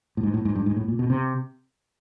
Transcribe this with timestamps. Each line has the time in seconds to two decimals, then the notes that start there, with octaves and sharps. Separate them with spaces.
0.17 A2
0.23 G#2
0.34 A2
0.45 G#2
0.56 G2
0.66 G#2
0.77 A2
0.88 A#2
0.99 B2
1.10 C3